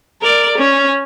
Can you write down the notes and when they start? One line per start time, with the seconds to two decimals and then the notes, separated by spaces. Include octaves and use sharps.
0.21 A#4 D5
0.59 C#4